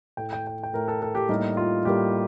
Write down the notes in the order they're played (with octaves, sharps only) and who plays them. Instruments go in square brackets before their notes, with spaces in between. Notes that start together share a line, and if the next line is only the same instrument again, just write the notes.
[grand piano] A2 A3 G5
G5
G5
G5
A2 A3 A#4
A4
A4
G4
A2 G3 A#3 D#4
F4
A2 G3 A#3 G4